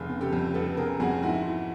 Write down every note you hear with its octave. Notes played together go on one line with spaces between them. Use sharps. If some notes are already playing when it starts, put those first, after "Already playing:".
Already playing: F1 G#4
C#3
G4 A4
F2
F1 A4 B4
C#3 G#4 A#4
F2 F#4 G#4
G#2 E4 F#4
E3